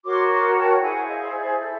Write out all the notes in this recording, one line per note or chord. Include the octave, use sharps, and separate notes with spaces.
F#4 A#4 C#5 C6 D6
C#6
C6 D6
A#5
G5 A5
E4 G#4 C5 F#5 G#5
D#5 F5
D5 E5
E4 A4 C5